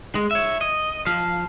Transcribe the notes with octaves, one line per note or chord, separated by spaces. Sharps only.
G#3
C#5 E5
D#5
F3 F5